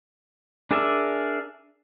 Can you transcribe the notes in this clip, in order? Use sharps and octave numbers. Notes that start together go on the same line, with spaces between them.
D4 G#4 A#4 D5 E5